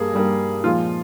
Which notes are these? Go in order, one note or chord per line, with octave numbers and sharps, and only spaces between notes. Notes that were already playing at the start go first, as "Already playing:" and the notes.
Already playing: G2 G3 A#3 G#4
G2 G3 A#3
A#2 F3 G#3 F4